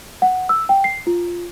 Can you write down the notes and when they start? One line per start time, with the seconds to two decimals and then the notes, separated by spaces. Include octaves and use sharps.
0.22 F#5
0.49 E6
0.69 G5
0.84 C7
1.07 F4